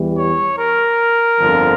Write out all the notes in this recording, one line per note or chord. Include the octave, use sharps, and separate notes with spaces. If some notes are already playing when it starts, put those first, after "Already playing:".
Already playing: E2 E3 G3
C#5
A#4
G1 F2 D3 F3